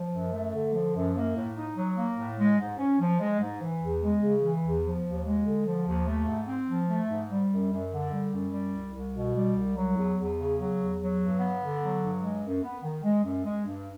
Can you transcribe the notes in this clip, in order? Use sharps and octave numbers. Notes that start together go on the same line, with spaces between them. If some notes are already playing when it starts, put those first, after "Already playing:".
Already playing: F3
F#2
A3
D3
F3
F#2
A#3
A2
D#4
F#3
A#3
A2
G#3
G#2
C#4
F3
G#3
G#2
E3
E2
G#3
C#3
E3
E2
F3
D#2
G#3
D3
F3
D#2
A3
G#2
C4
F3
A3
G#2
G3
F#2
F#2
D3
G3
F#2
G3
C2
C2
B2
G3
C2
F#3
E2
E2
C#3
F#3
E2
F#3
G2
B3
D3
F#3
G2
G#3
F#2
B3
D#3
G#3
F#2
G#3
G2